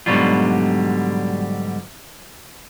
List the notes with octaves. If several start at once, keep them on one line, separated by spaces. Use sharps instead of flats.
G#2 B2 D3 F#3 G3 F4